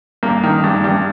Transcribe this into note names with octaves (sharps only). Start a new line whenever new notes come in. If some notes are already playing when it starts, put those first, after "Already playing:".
G2 A#3
D#3
G2
G2